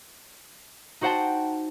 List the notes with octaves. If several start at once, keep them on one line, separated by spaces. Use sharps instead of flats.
D#4 F#4 C5 F#5 G5 A5